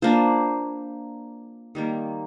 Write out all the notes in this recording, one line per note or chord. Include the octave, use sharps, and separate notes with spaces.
A#3 D4 F4 C5
D#3 G3 A#3